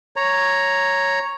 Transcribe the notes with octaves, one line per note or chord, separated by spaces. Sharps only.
C#5 A#5